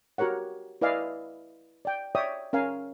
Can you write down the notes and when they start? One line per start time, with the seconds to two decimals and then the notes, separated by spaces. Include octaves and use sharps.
0.18 F#4 G4 A#4 C#5 F#5
0.81 E4 B4 D5 D#5 F5 G#5
1.85 D5 G5
2.15 C#5 D5 E5 G5 D#6
2.53 C#4 A#4 F5 G#5